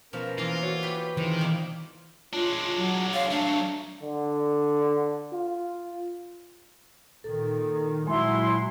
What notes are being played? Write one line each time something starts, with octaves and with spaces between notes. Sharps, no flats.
B2 F3 C#4 F4 A#4
E3 A#3 F4
F#4 C#5
G4 B4
C3 D#3 E3 F4 G#4 C5
B2 G3 A#3
G#3 D4 F4 C#5
F#3
C#5 F5
F#3 A3 D4 F5
D3
F4
A#2 D#3 A4
A#2 F#3 G#3 E4 C6